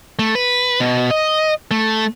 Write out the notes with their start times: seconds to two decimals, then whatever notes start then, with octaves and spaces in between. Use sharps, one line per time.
0.19 A3
0.35 B4
0.80 B2
1.10 D#5
1.71 A3